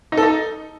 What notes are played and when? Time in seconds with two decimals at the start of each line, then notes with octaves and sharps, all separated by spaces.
0.12 D#4
0.17 A4
0.23 D#4